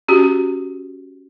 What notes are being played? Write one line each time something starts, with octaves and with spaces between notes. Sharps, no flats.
C#4 F#4 G4